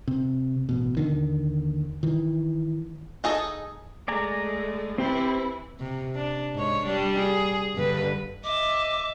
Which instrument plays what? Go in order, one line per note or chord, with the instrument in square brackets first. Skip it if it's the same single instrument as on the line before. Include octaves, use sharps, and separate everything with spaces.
[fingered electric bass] C3
A1 B2
D#2 D3 D#3
D#3 E3
[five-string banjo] D#4 G#4 A4 D#5
[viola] G#3 A3 [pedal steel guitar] D5 G#5 A#5
[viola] E3 E4 [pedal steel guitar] C4 G4 C5
[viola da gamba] C3
D4
G#2 C#5
G3 D4
G#4
G2 D3 B4
[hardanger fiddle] D#5 E5 [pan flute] D6